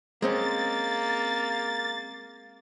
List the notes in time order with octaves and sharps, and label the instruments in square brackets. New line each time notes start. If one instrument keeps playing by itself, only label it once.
[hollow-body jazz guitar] G#3 C4 C#4 [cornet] A#3 [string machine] A6